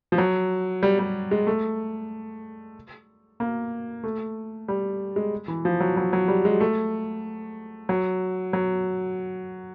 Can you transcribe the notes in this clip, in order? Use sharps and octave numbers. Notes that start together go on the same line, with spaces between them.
F3
F#3
G3
G3
G#3
A3
A#3
A3
G3
G#3
E3
F3
F#3
F#3
F#3
G3
G#3
A3
F#3
F#3